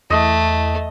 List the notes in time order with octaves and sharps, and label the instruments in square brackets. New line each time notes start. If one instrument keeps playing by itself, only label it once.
[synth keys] E2 [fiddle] A3 [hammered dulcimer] D#5